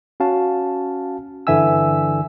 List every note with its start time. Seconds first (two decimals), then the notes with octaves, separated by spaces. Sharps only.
0.20 C#4 F#4 F5 A5
1.47 G2 D3 E3 E5 G#5 E6